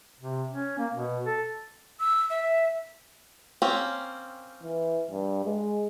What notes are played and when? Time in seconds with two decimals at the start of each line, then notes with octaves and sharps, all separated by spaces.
0.20 C3
0.51 C#4
0.78 A#3
0.93 B2
1.25 A4
2.00 E6
2.30 E5
3.62 A#3 C4 C#4
4.63 E3
5.11 G2
5.45 G#3